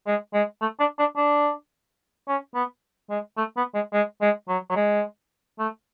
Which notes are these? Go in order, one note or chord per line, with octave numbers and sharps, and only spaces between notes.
G#3
G#3
A3
D4
D4
D4
C#4
B3
G#3
A3
B3
G#3
G#3
G#3
F#3
F#3
G#3
A3